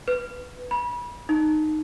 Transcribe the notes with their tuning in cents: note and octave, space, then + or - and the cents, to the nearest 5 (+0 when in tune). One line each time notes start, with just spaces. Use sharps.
B4 +5
B5 -30
D#4 -10